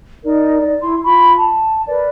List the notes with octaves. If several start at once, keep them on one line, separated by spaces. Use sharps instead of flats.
D#4 A#4 D5
D#4 D5
E4 C6
F4 B5 C#6
A5
A#4 B4 D5